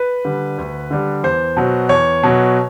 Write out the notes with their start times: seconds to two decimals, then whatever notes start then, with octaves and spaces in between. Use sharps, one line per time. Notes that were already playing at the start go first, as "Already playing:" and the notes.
Already playing: B4
0.25 D3 G3
0.58 D2
0.91 D3 G3
1.24 E2 C5
1.57 B2 F#3
1.89 E2 C#5
2.23 B2 F#3